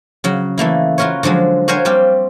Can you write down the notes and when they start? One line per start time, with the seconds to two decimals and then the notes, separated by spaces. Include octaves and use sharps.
0.24 C#3 F#3
0.58 E3 A3 A#3 E4
0.98 F4 F#4 A#4 B4 C#5
1.23 D3 F3 F#3 G#3
1.68 F#4 A#4 C5 C#5 F5 G#5
1.85 G3 A#3 C4 G4 F5